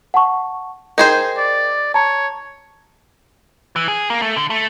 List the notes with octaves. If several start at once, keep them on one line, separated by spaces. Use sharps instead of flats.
F#5 A5 C#6
D#4 G#4 A#4 C5 G5
D5
C#5 A5 A#5
E3
G#4
A#3
A3
D3
A3